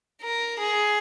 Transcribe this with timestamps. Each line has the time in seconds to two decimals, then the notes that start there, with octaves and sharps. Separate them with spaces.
0.22 A#4
0.60 G#4